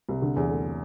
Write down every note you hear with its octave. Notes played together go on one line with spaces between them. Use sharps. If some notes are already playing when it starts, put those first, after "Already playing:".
C2
D3
E2
A3